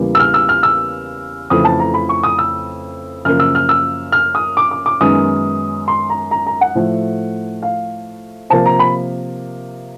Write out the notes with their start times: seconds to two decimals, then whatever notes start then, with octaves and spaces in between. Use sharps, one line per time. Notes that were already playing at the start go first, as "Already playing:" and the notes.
Already playing: E2 C#3 E3 G3 A#3
0.15 E6
0.20 F6
0.34 E6
0.49 F6
0.63 E6
1.50 F2 C#3 E3 A3 D#6
1.65 A5
1.80 A#5
1.94 B5
2.09 C#6
2.23 D#6
2.39 E6
3.25 F#2 C#3 F3 A#3 F6
3.40 E6
3.55 F6
3.69 E6
4.12 F6
4.35 D#6
4.57 D6
4.71 D6
4.86 D6
5.01 F#2 D#3 G#3 B3 D#6
5.88 C6
6.10 A#5
6.31 A#5
6.47 A#5
6.61 F#5
6.75 A2 F3 A3
7.62 F5
8.50 C3 F3 A#3 A5
8.66 A#5
8.79 B5